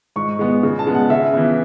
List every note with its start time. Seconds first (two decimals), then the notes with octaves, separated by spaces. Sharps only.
0.16 G#2 C#6
0.39 G#3 B3
0.63 C#3
0.79 A5
0.87 G#3 B3
0.94 F#5
1.10 C#3 E5
1.33 E3 B3